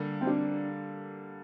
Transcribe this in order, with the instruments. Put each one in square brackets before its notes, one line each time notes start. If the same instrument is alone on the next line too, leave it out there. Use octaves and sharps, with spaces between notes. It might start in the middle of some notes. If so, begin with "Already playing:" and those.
Already playing: [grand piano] D3 G3 A#3
[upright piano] C4
D4